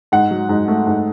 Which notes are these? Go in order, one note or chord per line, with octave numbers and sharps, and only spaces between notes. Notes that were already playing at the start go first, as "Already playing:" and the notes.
G#2 F#5
F#3
G#2
A3
G#2